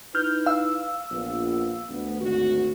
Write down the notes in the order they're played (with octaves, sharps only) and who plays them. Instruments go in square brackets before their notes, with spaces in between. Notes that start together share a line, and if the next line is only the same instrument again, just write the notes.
[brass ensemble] D#4 E4 B4 [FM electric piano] F6 G6
[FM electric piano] F5 E6
[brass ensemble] A#1 B3
D2 B3
G#1 D2 F#4